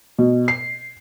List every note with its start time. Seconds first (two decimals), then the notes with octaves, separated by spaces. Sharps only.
0.19 B2
0.48 C7